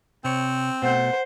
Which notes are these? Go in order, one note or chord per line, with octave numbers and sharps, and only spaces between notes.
C3 C4 C#5
B2 A3 C5 F#5